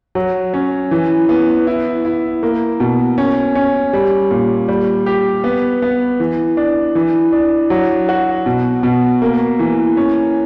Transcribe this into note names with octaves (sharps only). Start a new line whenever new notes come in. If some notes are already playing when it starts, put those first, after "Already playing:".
F#3
C#4
E3
B3
E4
E4
A#3
B2
C#4
C#4
G3
A#2
G3
G4
B3
B3
E3
D4
E3
D4
F#3
F#4
B2
B2
A#3
E3
C#4